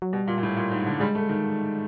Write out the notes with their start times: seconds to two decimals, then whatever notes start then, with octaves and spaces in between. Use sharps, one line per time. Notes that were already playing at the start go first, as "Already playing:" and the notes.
0.02 F#3
0.13 B2 G3
0.28 A#2
0.38 A#2
0.43 A2
0.57 A#2
0.71 G#2
0.86 D3
1.00 G3 G#3
1.15 A3
1.29 D#3